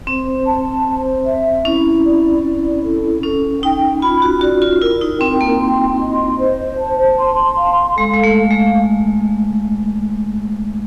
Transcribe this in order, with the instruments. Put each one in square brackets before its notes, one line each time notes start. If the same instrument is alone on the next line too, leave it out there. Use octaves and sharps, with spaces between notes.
[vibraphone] C4 [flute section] C5
[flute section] A5
C5
E5
[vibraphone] C#4 [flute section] E4
[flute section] D5
E4
A4
[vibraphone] C#4 [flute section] A4
[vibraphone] D#4 [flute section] G5
[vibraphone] F4 [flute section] B5
[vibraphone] F#4
[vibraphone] F#4 [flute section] D5
[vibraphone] F4
[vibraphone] E4 [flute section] A#4
[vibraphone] D#4
[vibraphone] C4 [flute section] G5
[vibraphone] A#3
[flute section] C6
D#5
C5
A5
C6
F5
[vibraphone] G#3 [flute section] A4
[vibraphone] G#3
A3
[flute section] F5
[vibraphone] G#3